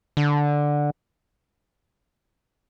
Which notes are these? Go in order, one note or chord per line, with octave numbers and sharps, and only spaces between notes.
D3